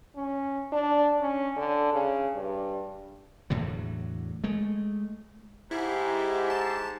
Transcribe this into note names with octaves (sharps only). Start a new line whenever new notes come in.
C#4
D4
C#4
D3
C#3
G2
E2 A2 D3 F#3
G#3 A3
G#2 E4 G4
A5